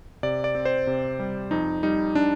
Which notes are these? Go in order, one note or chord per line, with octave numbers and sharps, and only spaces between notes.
C3 D5
D5
C4
C5
C3
G3
F2 D#4
G3 D#4
D4